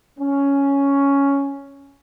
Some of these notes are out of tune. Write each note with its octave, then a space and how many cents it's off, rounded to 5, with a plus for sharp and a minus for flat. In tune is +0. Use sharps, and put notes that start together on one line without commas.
C#4 +5